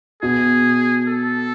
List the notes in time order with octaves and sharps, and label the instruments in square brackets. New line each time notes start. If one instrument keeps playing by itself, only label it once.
[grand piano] B2 [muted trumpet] G#4
[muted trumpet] A4